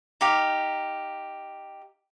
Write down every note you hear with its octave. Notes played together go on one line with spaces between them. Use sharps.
D#4 G4 F5